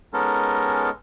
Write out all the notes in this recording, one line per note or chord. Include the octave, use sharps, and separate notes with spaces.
G#3 B3 C#4 D#4 A4 A#4